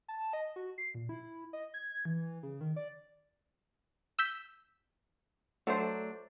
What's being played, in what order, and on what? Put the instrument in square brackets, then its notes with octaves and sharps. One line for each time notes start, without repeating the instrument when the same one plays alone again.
[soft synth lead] A5
D#5
F#4
C7
A#2
E4
D#5
G#6
E3
C#3
D#3
D5
[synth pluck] E6 G6 B6
[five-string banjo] F#3 D4 C5 [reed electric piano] A3 A4 D5